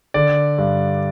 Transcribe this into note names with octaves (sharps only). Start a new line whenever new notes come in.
D3 D5
G2